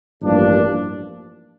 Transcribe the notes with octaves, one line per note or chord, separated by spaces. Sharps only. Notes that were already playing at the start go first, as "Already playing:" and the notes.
A1 G2 F3 A#3 D4